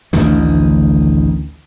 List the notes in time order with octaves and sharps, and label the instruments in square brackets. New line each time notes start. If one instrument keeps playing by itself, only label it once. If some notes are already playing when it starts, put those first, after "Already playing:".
[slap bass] A1 D2 D3 D#3